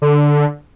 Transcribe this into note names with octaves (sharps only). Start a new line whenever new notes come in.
D3